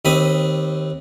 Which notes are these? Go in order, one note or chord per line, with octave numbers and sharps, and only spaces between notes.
D#2 C4 B5 D#6